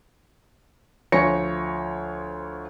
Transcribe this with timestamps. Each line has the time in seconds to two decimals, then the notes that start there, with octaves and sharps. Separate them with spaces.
1.12 D2 F3 C#5 G#5 A#6 C#7